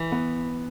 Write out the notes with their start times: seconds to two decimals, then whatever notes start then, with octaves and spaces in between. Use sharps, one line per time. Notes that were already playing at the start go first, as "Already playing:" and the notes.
Already playing: E3
0.12 B3